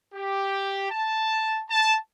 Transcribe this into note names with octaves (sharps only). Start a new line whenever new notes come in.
G4
A5
A5